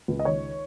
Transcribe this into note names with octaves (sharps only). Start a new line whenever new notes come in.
C#2
D#5
D#3 C#5